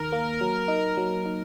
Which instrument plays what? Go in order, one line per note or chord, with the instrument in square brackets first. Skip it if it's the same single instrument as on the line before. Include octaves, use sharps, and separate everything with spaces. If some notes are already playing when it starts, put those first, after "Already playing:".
Already playing: [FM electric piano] D#2 D#3 [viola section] A#4
[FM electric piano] A#3
F#3
D#4
F#3
D#4